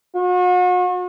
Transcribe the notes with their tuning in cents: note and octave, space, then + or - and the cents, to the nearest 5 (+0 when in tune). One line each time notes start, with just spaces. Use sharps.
F#4 -40